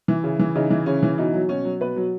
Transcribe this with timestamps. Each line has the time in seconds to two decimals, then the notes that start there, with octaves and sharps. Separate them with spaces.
0.08 E3
0.24 C#3
0.39 E3
0.55 C#3 D#4
0.70 E3
0.86 C#3 C#4
1.03 E3
1.18 B2 D#4
1.34 F#3
1.49 B2 C#4
1.65 F#3
1.81 B2 B4
1.96 F#3